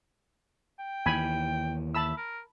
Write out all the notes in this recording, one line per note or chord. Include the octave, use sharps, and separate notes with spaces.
G5
D#2 E3 G#5 B5
E5 A5 B5 E6
A#4